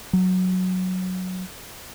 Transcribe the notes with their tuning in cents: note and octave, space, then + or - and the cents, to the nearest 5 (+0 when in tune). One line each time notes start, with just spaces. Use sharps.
F#3 -5